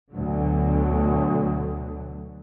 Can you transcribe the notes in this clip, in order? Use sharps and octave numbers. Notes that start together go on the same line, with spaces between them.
D2 B2 D3 F#3